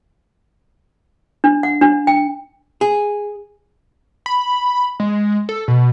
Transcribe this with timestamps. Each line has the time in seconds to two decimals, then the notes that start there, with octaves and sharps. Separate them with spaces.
1.44 D4
1.63 F#5
1.81 D4
2.07 G5
2.81 G#4
4.26 B5
5.00 G#3
5.49 A4
5.68 B2